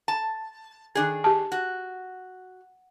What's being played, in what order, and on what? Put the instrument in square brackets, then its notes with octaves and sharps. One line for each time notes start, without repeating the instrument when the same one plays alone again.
[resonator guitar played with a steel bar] A5
D#3 D4 G#4
[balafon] G4 A5
[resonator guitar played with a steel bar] F#4